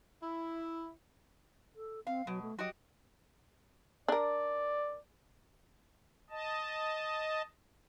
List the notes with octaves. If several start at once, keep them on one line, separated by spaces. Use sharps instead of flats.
E4
A4
C4 F5
B2 F#3
A3
F#3 F#4 G4 D#5
D4 A#4 D5
D#5 A5